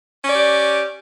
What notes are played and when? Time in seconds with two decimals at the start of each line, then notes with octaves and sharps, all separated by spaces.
0.23 C#4
0.28 D5
0.32 G4